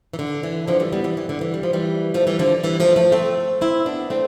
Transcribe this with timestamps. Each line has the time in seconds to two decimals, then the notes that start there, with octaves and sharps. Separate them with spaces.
0.13 E3
0.19 D3
0.43 E3
0.67 D3 F3
0.80 E3 G3
0.92 G3 B3
1.04 E3 G3
1.17 E3
1.29 D3
1.41 E3
1.54 G3
1.63 F3
1.73 E3 G3
2.14 F3 A3
2.27 E3 G3
2.39 D3 F3
2.63 E3 G3
2.80 F3 A3
2.96 F3 A3
3.12 A3 C4
3.61 C4 E4
3.86 B3 D4
4.10 A3 C4